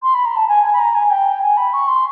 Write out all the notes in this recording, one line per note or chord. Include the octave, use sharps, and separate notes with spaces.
C6
B5
A#5
A5
G#5
G#5
B5
A#5
G#5
G5
G#5
B5
C#6
C6